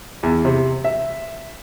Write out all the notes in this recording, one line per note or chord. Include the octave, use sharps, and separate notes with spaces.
E2
C3
E5